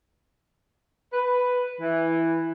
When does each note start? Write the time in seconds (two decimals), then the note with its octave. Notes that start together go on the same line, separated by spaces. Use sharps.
1.13 B4
1.81 E3